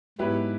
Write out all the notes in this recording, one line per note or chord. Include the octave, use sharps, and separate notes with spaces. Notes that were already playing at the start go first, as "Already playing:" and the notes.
G#2 F#3 B3 E4 G4 B4